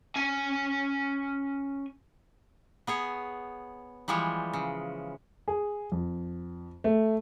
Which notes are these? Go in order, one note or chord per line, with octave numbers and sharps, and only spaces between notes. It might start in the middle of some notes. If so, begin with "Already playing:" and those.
C#4 G#5
B3 G#4 C#5
E3 F3 G3 G#3 C#5
C#3
G#4
F2
A3